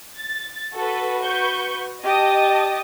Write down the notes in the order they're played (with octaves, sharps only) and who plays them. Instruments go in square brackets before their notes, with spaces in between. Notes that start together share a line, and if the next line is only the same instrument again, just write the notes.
[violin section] A6
[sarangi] F#4 [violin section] A4 B4
[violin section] B4 C#6 G6
[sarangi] G4 [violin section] D#5 A5 D#6